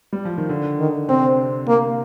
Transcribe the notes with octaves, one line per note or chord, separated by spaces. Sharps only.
G3
F3
D#3
D3
D#3
C3 C4
A#3